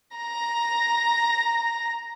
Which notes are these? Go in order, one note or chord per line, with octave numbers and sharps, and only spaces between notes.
A#5 A#6